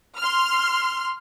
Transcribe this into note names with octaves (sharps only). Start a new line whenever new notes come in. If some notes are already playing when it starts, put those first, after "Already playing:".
C6 F6